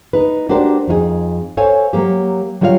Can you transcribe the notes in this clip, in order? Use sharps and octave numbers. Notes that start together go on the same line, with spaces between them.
D#4 B4
D4 F#4 G4 A#4 C5 D5
F2 D#4 F4 G#4
A4 C5 C#5 F5 G#5
F#3 A3 A#3 G4
F#3 G3 F4 C#5 E5 F5